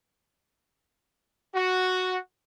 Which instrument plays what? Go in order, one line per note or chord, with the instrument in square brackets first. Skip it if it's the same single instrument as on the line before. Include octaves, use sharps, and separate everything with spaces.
[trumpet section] F#4